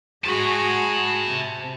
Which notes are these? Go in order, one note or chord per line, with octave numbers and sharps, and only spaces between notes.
G#3 F#4 G#4 A5 B5
C3